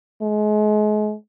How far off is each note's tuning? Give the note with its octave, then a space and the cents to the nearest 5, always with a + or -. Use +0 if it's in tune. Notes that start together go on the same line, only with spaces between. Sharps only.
G#3 +35